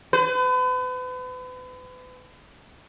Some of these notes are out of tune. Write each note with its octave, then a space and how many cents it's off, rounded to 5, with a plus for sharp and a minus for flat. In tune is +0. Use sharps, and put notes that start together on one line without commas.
B4 +40